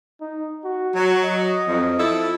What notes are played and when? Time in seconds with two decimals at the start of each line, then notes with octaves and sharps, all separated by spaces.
0.21 D#4
0.64 F#4
0.95 F#3
1.24 D#5
1.68 F2
1.99 F3 E4 A4